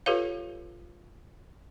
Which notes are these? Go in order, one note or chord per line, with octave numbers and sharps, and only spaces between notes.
F4 G4 A4 B4 C#5 F5